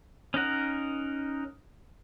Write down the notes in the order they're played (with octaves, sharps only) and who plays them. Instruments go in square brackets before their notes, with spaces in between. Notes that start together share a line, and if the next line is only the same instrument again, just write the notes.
[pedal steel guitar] C#4 D#4 A#4 F#5